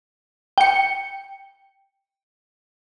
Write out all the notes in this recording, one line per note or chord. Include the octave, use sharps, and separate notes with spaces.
G5 C#7